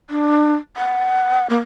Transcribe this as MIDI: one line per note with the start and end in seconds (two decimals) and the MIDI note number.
0.10 0.55 62
0.77 1.47 78
1.50 1.58 58